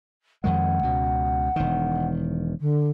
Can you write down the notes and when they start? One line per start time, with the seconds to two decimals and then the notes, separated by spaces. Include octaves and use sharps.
0.44 F2 D#3 G#3 F#5
0.83 C#2 B2
1.56 E1 D#3
2.60 D3